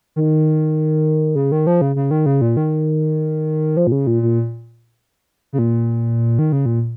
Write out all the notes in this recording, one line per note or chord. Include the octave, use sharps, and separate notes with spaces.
D#3
C#3
D#3
F3
C#3
C#3
D#3
C#3
A#2
D#3
F3
A#2
C#3
A#2
A#2
C#3
A#2
D#3
C#3
A#2